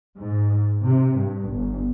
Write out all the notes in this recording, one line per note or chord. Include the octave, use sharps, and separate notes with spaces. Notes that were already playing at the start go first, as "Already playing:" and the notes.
G#2
C3
G2
G1